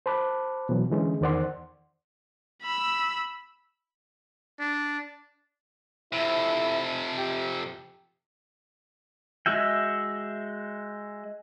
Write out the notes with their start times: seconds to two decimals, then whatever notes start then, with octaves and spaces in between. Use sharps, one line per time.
0.06 C5 A5 B5 D6 F#6
0.69 B2 E3 F#3
0.90 D3 E3 G#3 C#4
1.21 E2 D#3 C5 D5 F#5 C6
2.62 B5 E6
4.59 D4
6.13 F2 C3 E4
7.18 G4
9.46 G#3 F#4 E5 G5